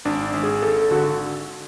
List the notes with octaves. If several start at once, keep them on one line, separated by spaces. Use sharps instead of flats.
G#1 D4
G#1
G#4
G#1 A4
A4
D3 F#4